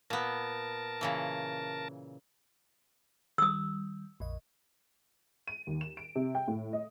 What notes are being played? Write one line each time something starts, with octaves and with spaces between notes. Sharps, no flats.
A#2 B3 A#4 A5
A#2 C#3 E3
D#3 G3 D#6 E6
A#1 F2 D#5
D#7
D#2
E7
D7
C3
G5
A2
D#5